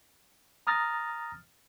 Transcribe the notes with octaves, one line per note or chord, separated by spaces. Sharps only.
A#5 D#6 F6 A6 A#6